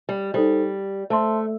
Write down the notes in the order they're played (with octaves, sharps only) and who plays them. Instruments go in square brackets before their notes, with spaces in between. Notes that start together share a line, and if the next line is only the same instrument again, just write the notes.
[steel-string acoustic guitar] G3
[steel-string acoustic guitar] G3 [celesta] D#4 A4 C5
[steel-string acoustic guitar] A3 [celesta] C5 E5 A5 C6